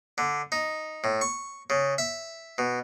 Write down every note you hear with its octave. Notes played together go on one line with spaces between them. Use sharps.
D3
D#4
A2
C#6
C#3
E5
B2